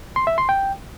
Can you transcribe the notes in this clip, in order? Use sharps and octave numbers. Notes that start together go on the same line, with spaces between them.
C6
E5
C6
G5